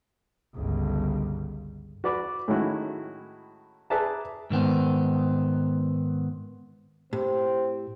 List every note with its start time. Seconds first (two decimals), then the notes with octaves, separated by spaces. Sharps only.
0.55 G1 C#2
2.04 F#4 B4 D5 B5 D6
2.48 A2 D#3 G#3 C#4 E4 F#4
3.90 G#4 B4 D5 E5 A5 A#5
4.50 G#2 D#3 B3 C4
7.13 A2 C4 G4